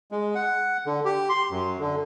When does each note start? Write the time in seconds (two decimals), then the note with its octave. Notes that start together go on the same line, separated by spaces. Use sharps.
0.12 G#3
0.35 F#5
0.86 D3
1.05 G4
1.29 C6
1.51 F#2
1.80 D3